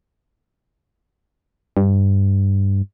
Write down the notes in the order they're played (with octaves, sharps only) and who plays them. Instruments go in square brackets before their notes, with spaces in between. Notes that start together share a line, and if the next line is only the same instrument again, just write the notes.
[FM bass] G2